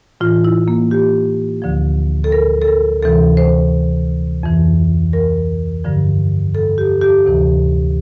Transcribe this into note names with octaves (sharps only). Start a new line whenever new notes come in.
A2 E3 F4
E4
A#3
G4
D2 D3 F3
A4
A#4
A4
A#4
D2 C3 E3 A4
C5
F2 E3
A#4
G2 D3 F3
A4
G4
G4
D2 C3 E3